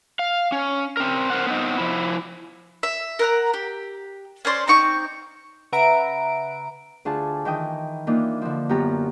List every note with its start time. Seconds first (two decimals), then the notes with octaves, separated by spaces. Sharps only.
0.19 F5
0.52 C#4
0.97 C4 A#4
1.30 A#4 C5 F#5
1.47 B3 C4 D#4
1.78 F3 E4
2.83 E5
3.19 A#4 F#5 A#5
3.54 G4
4.45 C#4 C5 D5 C6
4.68 C4 D#4 C#6 D6
5.72 C#3 B4 E5 F#5 A#5 D7
7.05 D2 D4 F4 G#4 A5
7.45 D#3 E3 G5 D#6
8.07 E3 A#3 D4 D#4 F4
8.42 D3 F3
8.69 F#2 B3 F4 G4 A#5